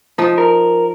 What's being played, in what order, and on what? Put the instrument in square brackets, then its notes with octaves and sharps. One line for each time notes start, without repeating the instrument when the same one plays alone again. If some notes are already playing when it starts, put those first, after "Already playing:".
[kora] F3 D#4
[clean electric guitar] A#4